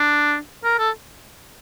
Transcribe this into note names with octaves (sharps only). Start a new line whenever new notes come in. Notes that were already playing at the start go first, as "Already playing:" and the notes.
Already playing: D4
A#4
A4